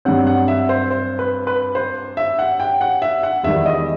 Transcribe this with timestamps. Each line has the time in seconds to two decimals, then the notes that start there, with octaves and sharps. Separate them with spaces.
0.05 G2 F#3 C4 F#5
0.27 F#5
0.48 E5
0.69 C5
0.91 C5
1.19 B4
1.47 B4
1.75 C5
2.17 E5
2.39 F#5
2.60 G5
2.81 F#5
3.02 E5
3.23 F#5
3.44 E2 D#3 G3 E5
3.66 D#5